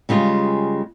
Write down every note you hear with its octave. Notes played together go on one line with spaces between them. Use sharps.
C#3 G3 G#3 F4